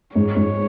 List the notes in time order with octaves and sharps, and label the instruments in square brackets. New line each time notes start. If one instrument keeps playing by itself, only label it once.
[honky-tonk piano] G#2 [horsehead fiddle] C#5
[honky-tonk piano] G#2